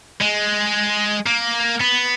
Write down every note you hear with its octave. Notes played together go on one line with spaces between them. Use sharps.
G#3
A#3
B3